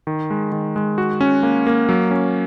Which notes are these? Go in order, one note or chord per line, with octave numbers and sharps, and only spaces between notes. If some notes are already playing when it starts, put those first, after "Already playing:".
D#3
G#3
D#3
G#3
F#4
C#4
A#3
A#3
F#3
C#4